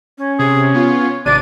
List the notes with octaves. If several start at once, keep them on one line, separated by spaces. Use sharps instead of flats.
C#4
C3 G#4
B3 F4 C#5
G#1 C3 D4 D5 D#7